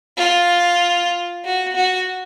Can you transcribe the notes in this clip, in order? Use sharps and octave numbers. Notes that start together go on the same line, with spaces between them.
F4
F#4
F#4